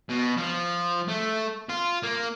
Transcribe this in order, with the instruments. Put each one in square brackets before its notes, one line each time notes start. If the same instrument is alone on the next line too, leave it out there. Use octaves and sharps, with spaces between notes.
[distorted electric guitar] B2
F3
A3
F4
A#3